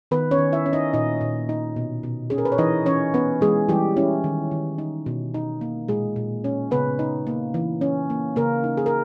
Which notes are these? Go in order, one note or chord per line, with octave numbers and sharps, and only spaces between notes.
D#3 B3 B4
C#4 C#5
D#3
E4 E5
C#4
D#4 D#5
A#2 D#4 D#5
A#2
D#4
B2
B2
C#4 G#4
A#4
B4
C#5
E3 D#4 D#5
E3 C#4 C#5
B3 C#4 B4
E3 G#3 G#4
E3 G3 G4
C#4 E4
D#3
D#3
D#4
B2
D#4
A#3
A#2 G#3 G#4
A#2
C#4
C#3 B3 B4
D#4
A#3
E3
C#4
A#3
C#3 A#3 A#4
D#4
G#4
A#4